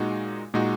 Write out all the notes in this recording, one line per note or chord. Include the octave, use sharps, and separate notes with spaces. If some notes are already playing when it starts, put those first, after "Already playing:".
Already playing: A#2 G#3 D#4 F#4
A#2 G#3 D#4 F#4